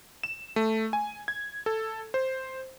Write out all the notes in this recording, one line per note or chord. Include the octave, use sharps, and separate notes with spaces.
E7
A3
G#5
G#6
A4
C5